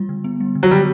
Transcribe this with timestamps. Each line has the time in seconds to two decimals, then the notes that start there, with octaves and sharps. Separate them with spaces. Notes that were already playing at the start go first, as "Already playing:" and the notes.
Already playing: G3 F4
0.09 D3
0.24 B3
0.40 G3
0.55 D3
0.63 F#3
0.71 D3 G3